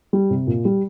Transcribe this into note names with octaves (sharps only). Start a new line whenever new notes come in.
G3
C3
A#2
G3